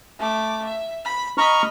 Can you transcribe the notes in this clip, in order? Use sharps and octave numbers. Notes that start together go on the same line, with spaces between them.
A3 D6
E5
B5
D#5 A#5 B5 C#6 F6